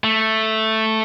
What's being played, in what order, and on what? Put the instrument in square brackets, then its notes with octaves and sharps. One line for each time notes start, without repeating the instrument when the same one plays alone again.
[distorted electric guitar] A3